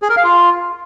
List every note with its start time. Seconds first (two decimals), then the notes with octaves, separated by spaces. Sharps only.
0.02 G#4
0.09 A#4
0.17 F5
0.24 F4